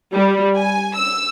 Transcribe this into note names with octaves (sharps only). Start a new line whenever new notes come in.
G3
G#5
E6